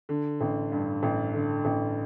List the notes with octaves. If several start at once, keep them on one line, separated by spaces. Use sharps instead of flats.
D3
A1
G2
A1
D3
A1